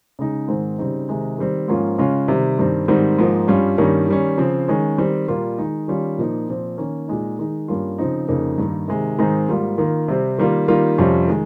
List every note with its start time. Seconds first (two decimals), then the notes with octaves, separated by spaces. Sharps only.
0.19 C#3 G#3 D#4
0.48 G#2 D#3 G#3 C4
0.78 C#3 G3 C4 D#4
1.09 C3 D#3 G#3 D#4
1.38 D#3 G3 C4
1.68 G#2 F3 A#3 C#4 F4
1.98 C#3 G#3 C#4 F4
2.28 C3 D#3 G3
2.59 G2 D#3 G3 C4
2.88 G#2 D#3 G3 C4
3.18 G#2 F3 A#3 D#4
3.48 G2 G3 C#4 F4
3.78 G2 D#3 G3 A#3 C#4
4.08 D#3 G3 C#4
4.38 C#3 F3 C4
4.68 D#3 G#3 C#4
4.98 D#3 G3 C4
5.28 A#2 G3 A#3 F4
5.58 D#3 G#3 D#4
5.88 D#3 G3 C#4 F4
6.18 A#2 F3 A#3 D#4
6.49 A#2 F3 C4
6.78 D#3 A#3 C#4
7.08 A#2 G#3 D#4
7.39 D#3 G#3 D#4
7.68 G2 G3 A#3 C#4 F4
7.98 C#3 F3 C4 D#4
8.28 F2 C#3 F3 A#3 D#4
8.58 G2 D#3 A#3 D#4
8.88 C3 D#3 G#3
9.18 G#2 D#3 G#3 C4 D#4
9.49 G#2 G3 A#3 F4
9.78 D#3 A#3 F4
10.08 C3 G3 C4
10.38 D#3 G3 A#3 F4
10.68 D#3 G3 A#3 F4
10.98 F2 C3 G3 C#4 F4
11.28 D#3 G#3